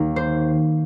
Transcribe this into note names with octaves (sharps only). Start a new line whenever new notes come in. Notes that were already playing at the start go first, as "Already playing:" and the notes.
Already playing: D#2 D#3 A#3 A#4
C5